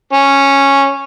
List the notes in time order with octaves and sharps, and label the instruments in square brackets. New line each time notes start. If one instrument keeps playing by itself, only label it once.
[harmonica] C#4